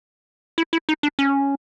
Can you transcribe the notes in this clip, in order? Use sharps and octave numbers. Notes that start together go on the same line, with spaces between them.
E4
E4
D#4
D4
C#4